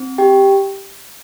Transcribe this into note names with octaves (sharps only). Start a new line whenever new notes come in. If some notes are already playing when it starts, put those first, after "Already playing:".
Already playing: C4
G4 G5